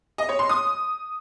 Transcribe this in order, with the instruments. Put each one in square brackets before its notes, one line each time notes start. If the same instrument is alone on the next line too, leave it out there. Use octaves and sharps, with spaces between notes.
[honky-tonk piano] D#5
C#5
C6
D#6